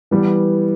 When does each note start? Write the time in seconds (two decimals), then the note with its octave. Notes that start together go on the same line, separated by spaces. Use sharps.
0.11 E3 G3 B3